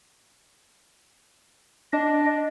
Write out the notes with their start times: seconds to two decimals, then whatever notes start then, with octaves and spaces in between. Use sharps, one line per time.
1.93 D4 D#5